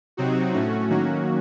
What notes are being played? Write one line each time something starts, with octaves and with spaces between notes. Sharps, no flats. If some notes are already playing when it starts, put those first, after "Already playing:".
C3 F#3 C4 D#4 F#4
A2 A3 C#4 F#4
D#3 F#3 A#3 C#4 F#4